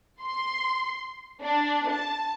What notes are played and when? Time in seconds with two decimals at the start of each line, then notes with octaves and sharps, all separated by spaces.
0.22 C6
1.42 D4
1.90 A5